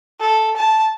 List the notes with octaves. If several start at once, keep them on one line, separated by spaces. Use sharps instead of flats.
A4
A5